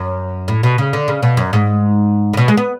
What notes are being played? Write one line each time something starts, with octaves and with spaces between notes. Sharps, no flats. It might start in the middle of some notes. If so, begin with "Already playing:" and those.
Already playing: F#2
A2
B2
C#3
D3
C#3
B2
F#2
G#2
A2
B2
G#3
B3